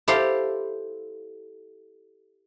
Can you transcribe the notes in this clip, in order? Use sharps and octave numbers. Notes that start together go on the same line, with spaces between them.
E4 G4 A4 C5 E5 F5